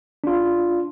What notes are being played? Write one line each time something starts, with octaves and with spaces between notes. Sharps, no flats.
D4 F4